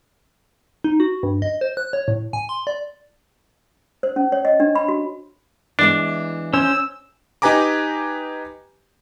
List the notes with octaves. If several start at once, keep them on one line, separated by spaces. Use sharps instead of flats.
D#4
F#4
G2
D#5
C5
F#6
C#5
A2
G#5
C6
D5
C5
C#4
C#5
D#5
D4
B5
F#4
E3 G#3 B3 D4
C#4 C5 E6
D#4 G4 B4 G#5 A#5 D6